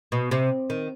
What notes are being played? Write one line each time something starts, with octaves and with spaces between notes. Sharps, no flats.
B2
C3
D#3